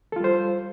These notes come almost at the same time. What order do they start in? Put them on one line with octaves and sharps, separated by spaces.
A4 F4 G3 C5